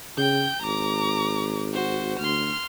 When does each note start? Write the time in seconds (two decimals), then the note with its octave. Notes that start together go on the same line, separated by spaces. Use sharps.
0.17 C#3 G5 G6
0.62 G#1 A#5 D6
1.73 F#4 C5
2.19 D2 C6 F6